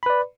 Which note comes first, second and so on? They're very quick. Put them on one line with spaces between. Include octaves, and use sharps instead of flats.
B5 B4 D5